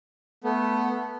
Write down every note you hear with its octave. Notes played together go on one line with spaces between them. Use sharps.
A3 B3